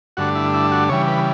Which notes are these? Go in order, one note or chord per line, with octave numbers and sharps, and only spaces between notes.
G2 D3 A3 D4 F#4
E4
E4
F#4
C#3 E3 G3 C#5
B4